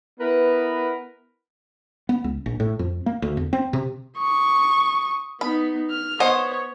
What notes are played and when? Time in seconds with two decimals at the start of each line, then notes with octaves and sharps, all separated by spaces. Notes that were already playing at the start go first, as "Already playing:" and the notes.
0.20 B3 E4 A#4 B4
2.09 B3
2.24 C#2
2.46 A#1
2.60 A2
2.79 F2
3.06 A#3
3.22 D2
3.37 E2
3.53 C4
3.73 C3
4.18 C#6 D#6
5.41 B3 D#4 B5
5.91 F6
6.20 B3 C5 C#5 D#5 F#5